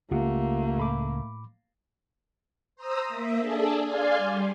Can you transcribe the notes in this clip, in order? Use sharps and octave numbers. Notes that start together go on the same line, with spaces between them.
C#2 C#3 A3 A#3 F4 G4 F#5
A2 B5 D6
C5 A#5 D#6 E6
A#3 E5
D4 G#4 A4
D5 F5 G#5 C6
G3